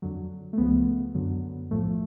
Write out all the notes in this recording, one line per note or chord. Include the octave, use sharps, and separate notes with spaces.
F2 D3 F#3
A3
C#2 C#3 F3 B3
F#2 D3 F#3
B1 A2 F3 A3